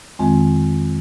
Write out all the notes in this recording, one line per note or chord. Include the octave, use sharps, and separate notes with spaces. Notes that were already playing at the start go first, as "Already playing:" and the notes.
F2 D#3 G#3 C4